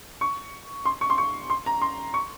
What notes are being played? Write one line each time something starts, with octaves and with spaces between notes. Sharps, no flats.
C#6
C6
C#6
C6
C#6
C6
A#5
C6
C#6